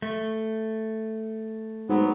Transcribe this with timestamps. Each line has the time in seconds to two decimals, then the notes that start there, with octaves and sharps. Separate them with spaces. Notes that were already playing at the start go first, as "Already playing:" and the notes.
0.02 A3
1.89 G#2 F#3 B3